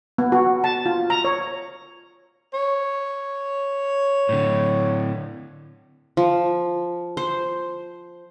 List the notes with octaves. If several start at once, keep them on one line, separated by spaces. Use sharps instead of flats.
B3
F#4
A5
F4
A#5
C#5
C#5
A2 D3
F3
C5